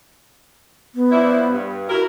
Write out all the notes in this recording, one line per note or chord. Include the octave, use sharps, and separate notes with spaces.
B3
F3 D4 E4
G2
E4 F#4 A#4